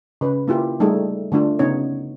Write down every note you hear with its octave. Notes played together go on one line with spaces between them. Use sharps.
C#3 B4
A#3 E4 F4 G4
G3 A3 D#4 G#4 A4
D3 A3 D4 F4
C#3 B3 C#4 D#4 C#5